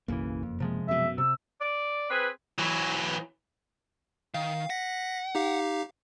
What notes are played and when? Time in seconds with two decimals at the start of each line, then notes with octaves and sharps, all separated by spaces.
0.08 F#1 B1 F#2 C#3 E3 A#3
0.43 F2
0.60 C3 F3 G#3
0.88 F#2 B2 E5
1.18 C3 E6
1.61 D5
2.10 C4 G#4 B4
2.59 E3 F#3
4.34 D#3 F5
4.70 F#5 A#6 B6
5.35 D#4 G4 F5